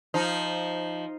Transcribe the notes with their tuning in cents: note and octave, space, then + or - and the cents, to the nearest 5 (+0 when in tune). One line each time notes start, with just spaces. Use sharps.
F3 -5 D#4 +0